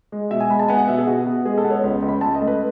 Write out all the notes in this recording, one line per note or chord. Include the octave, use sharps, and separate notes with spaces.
G#3
B2 E5
G#5
G#3 B5
A5
B3 G#5
F#5
B2 E5
G#4
B2 F#4
B3
G#3 G#4
A4
B3
C#5
C#2
C#2
B5
C#2 A5
D#5
A3
B4